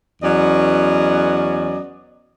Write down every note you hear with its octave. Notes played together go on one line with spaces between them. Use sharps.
E2 F#3 B3 C#4 D5 D#5